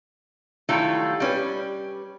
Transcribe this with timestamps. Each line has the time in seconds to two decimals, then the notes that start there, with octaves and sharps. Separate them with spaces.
0.69 D#3 F#3 G3 A3 E4 F4
1.20 G3 C#4 B4